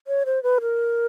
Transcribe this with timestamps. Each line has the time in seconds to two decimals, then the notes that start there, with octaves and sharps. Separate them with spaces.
0.07 C#5
0.26 C5
0.43 B4
0.61 A#4